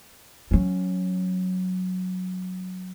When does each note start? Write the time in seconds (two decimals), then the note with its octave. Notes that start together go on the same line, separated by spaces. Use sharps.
0.51 F#3 C#4